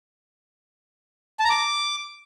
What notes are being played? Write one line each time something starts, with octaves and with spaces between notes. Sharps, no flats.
A5
A#5
D6